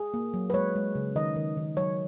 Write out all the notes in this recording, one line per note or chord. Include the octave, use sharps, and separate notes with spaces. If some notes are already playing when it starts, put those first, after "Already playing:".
Already playing: G#4
A#3
F#3
B4
G#3 C#5
G#3
C#3
D#3 D#5
D#3
D#3
F#3 C#5